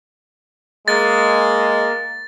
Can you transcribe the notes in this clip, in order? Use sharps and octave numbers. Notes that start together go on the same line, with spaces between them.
G#3 A#3 A6